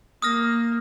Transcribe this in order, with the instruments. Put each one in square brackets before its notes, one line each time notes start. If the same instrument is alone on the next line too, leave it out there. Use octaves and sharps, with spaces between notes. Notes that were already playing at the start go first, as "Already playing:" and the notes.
[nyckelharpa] A#3 [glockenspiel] D#6 F6 A#6